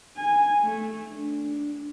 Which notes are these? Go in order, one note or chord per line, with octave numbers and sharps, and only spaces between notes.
G#5
A3
D4